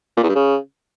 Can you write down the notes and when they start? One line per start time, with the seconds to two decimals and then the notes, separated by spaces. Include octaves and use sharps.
0.17 A#2
0.23 E2
0.29 G2
0.35 C#3